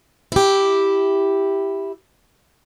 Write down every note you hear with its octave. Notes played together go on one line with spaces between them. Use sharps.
E4 G4